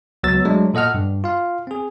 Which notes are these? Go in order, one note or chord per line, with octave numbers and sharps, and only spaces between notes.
C#2 F#3 B3 E6 A6
F#3 G#3 A3 D4
A#2 A4 D#5 F#5 F6
G2
F4 F5
C4 G#4